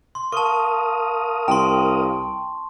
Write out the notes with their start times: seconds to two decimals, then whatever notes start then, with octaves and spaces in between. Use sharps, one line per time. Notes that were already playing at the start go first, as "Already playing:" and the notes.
0.15 C6
0.32 A#4 F5 A5 C#6 D#6
1.48 C2 G5 A#5 C6